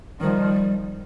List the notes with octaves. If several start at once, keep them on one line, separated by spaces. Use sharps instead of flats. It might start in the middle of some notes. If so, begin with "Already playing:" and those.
D#3 F3 G3